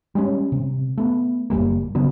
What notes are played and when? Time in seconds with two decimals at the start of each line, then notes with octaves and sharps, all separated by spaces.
0.15 G3 G#3 A#3 C#4
0.52 C3
0.98 A3 B3
1.50 F#1 G#2 G3 A#3
1.95 C#3 F#3 B3